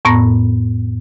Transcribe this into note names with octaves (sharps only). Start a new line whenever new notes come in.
F2 A2 B3 A#5 A#6